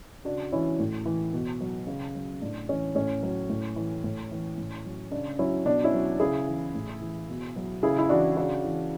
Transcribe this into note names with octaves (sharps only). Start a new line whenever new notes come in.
C#3 D4 F#4
E3 C#4 E4
A2
E3
B2
F#3
C#3
F#3
A2 D4
E3 C#4
A2 C#4
F#3
A2
E3
A2
E3
A2
F#3
C#3 D4
F#3 C#4 E4
B2 D4
C#4 E4
F#3
C#3 E4 G#4
E3
A2
E3
B2
F#3
C#3 E4 G#4
E4
E3 D4 F#4
C#3 D4 F#4
E3